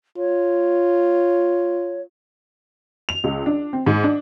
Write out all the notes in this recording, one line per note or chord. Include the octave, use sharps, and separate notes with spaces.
F4 C#5
F7
C#2
D4
C4
G#2
D4